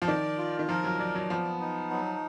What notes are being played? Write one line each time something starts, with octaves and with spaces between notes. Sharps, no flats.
F3
D#3 D5
F4
D#3
F3 A#4
F#3
F#3 D5
F#3
F3 B3
D#4
F#3